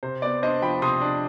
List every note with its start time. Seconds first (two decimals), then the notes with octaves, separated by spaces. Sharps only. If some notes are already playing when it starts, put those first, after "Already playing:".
0.03 C3 C5
0.22 B3 D5
0.43 D4 C5 D#5
0.62 F3 G5 B5
0.82 C3 C6 D#6
1.02 D4